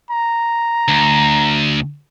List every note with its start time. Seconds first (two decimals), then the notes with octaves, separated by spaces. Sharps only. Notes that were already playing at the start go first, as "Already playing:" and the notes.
0.11 A#5
0.88 D2